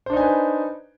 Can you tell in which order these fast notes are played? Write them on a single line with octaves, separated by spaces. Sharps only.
C5 D4 D#4 G#5 B4